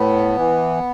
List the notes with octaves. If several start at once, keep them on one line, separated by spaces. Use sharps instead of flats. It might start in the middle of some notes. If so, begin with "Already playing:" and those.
Already playing: A2 B3
E3